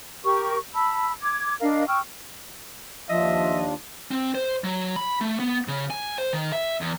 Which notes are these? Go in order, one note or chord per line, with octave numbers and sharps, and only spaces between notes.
G4 A#4 C#6
A5 B5 E6
D6 G#6
D4 A#4 D#5 F5
G5 C#6 E6 F6
D#2 F3 D4 F4 D#5 E5
C4
C5
F#3
B5
A3
B3
C#3
G#5
C5
D#3
E5
E2